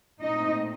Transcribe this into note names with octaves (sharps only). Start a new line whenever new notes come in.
A#2 A3 C4 D#4 D#5